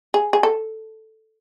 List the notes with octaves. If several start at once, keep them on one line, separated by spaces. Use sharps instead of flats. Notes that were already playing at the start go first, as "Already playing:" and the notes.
G#4
G#4
A4